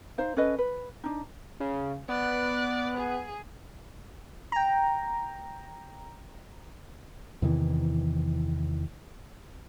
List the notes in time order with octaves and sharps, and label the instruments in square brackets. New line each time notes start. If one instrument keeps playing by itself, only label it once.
[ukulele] D#4 C5 F5
C#4 A4 B4 D#5
B4
D4 D#4
[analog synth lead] C#3
[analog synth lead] B3 [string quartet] D5 F#6
[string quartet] G#4
[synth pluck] G5 A#5
[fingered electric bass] E2 C3 D#3 E3